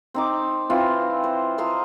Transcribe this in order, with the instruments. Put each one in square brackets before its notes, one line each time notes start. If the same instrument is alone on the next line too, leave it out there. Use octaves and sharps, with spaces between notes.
[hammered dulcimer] C4 D#4 D6
E3 C4 F4
C5
F3 D#5 A#5 C6